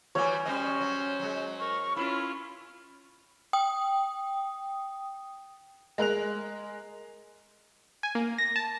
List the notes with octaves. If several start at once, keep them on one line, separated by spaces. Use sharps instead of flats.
E3 G3 F#4 C#5 G#5
G3 C#4 C5 D#5
F#3
F#3 G#3
A#4 C#6
C#4 E4 F4 B5
G5 D#6
G#3 A#4 F#6 F7
G#5
A#3
A#6
A5